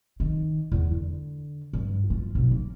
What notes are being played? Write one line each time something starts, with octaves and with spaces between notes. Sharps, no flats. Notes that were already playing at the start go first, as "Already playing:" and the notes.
D#3
E2
D3
G2
F4
B1
A#3